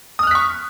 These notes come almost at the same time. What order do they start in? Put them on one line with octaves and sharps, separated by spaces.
D#6 F6 F#6 B6 C#6